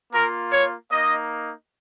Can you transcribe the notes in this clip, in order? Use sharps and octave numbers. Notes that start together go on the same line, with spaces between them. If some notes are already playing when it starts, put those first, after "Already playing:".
A#3 F4 A#4
C#5
A#3 D#4 D#5